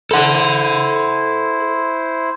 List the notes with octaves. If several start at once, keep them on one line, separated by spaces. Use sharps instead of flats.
E4 A4 C5 F#5